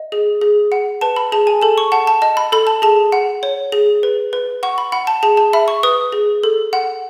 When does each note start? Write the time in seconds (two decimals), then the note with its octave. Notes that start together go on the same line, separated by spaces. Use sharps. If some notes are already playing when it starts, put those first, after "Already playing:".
Already playing: D#5
0.12 G#4
0.41 G#4
0.72 F#5
1.01 B4 A5
1.16 B5
1.32 G#4 A5
1.47 G#5
1.62 A4 A5
1.78 C#6
1.92 F#5 A5
2.07 A5
2.22 D#5 A5
2.37 B5
2.52 A4 B5
2.67 A5
2.82 G#4 A5
3.12 F#5
3.43 C#5
3.72 G#4
4.03 B4
4.33 B4
4.63 F#5 C#6
4.78 B5
4.92 F#5 B5
5.07 A5
5.23 G#4 A5
5.37 A5
5.53 E5 B5
5.68 C#6
5.83 B4 D#6
6.12 G#4
6.43 A4
6.73 F#5